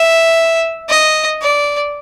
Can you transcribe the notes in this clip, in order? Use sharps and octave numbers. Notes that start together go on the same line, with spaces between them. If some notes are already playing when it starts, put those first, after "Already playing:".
Already playing: E5
D#5
D5